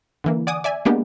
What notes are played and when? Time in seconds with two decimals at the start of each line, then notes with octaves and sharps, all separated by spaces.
0.24 D3 E3 A#3
0.47 D5 F#5 G#5 D6 D#6
0.64 D5 E5 G#5
0.85 G#3 A#3 B3 D4 G4